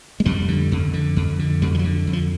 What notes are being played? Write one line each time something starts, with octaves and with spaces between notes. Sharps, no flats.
G#3
F2 G3
D3
F2
D3
F2
D3
F2 G3
F3
F#3
D3
F2
F3